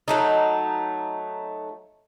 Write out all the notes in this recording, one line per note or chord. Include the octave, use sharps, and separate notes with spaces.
F#3 A3 D#4